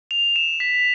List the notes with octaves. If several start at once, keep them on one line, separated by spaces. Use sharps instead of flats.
F7
E7
B6